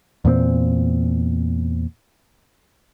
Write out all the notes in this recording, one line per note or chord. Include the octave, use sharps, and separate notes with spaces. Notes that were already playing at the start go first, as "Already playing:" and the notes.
E2 A#2 B3 C4